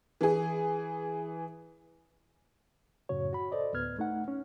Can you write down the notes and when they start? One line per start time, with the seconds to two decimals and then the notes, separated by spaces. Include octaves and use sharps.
0.21 E3 G#4
3.09 F#2 A2 C#3 F#4 C#5
3.33 F#4 B5
3.52 A4 C5 D5 D#5
3.73 D2 A2 B3 B4 F6 G#6
3.99 A3 D#4 F#5
4.28 C#4